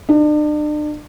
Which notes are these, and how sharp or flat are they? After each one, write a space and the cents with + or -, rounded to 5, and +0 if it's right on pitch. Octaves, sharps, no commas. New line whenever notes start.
D4 +40